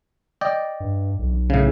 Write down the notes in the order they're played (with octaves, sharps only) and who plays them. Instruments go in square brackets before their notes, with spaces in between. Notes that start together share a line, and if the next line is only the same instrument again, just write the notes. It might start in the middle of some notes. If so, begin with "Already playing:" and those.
[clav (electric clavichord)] D5 D#5 G5
[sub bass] G2
B1
[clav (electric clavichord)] A2 C#3